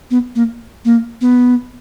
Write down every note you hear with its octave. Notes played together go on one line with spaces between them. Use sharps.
B3
A#3
A#3
B3